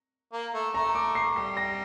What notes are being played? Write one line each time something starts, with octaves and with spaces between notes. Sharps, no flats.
A#3
A3
A3 A#5
D6
C7
G3 C7
A#6